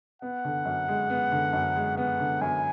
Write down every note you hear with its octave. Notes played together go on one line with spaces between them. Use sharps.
B3 F#5
D3
F#2
G#3
B3
D3
F#2
G#3
B3 F#5
D3
F#2 G#5